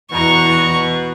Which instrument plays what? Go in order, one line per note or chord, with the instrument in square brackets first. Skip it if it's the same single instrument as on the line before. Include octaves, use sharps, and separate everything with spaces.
[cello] E2 [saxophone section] B2 [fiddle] A#5 C#6